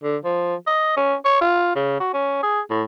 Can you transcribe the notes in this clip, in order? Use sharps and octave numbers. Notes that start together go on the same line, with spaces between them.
D3
F3
D#5
C#4
C#5
F4
C#3
F#4
C#4
G#4
A2